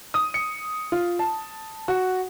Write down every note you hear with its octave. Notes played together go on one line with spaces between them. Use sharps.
D#6
C#7
F4
A5
F#4